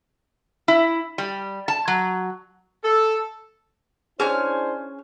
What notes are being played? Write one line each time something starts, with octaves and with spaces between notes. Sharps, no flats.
E4
G3
A5
F#3
A4
C#4 D4 E4 G#4 C5 C#5 G#5 F6